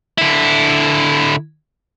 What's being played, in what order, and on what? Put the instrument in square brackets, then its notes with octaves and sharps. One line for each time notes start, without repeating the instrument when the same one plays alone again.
[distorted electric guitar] D3 E4